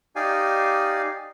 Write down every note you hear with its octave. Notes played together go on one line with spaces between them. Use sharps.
D#4 G4 D5 F5 G#5